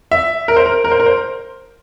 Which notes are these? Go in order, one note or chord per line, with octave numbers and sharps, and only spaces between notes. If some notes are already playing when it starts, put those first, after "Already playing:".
E5
A#4
C5
A#4
A#4
C5
A#4
C5